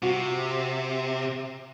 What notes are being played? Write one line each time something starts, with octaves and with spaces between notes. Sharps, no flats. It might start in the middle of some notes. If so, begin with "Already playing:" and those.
C3 F#4